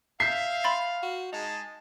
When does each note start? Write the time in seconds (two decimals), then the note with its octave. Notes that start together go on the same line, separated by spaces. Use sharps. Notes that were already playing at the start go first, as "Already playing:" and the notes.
0.20 E5 F5 G6 B6 C7
0.64 B5 C6 A6
1.03 F#4
1.32 G#3 D#4 G#4 A5